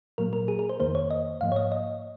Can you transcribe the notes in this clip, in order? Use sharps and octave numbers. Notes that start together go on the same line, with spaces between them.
A#2 F#3 A#3 A#4
A#4
G#4
A#4
C5
F2 D#3 A#3 C5
C#5
D#5
G#2 F3 A#3 F5
C#5
D#5
D#5